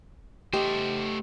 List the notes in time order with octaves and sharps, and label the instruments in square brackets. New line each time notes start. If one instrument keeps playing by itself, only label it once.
[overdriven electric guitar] A3 C5 [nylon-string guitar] G4 D#5